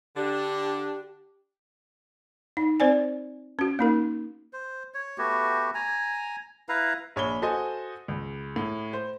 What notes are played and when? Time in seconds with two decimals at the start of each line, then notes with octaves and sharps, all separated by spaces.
0.16 D3 D4 G4
2.57 D#4
2.80 C4 C5 D5 G#5
3.59 C#4 F#4
3.79 A#3 D#4 A#4
4.53 C5
4.94 C#5
5.18 A3 B3 F#4 G4
5.75 G#5 A#5
6.69 E4 B4 F5 A#5
7.16 A#1 C#5 B5 G7
7.42 F#4 A4 C5 D#5 G#5
8.08 C#2
8.56 A2
8.93 C5